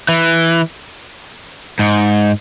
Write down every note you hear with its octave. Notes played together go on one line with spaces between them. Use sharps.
E3
G#2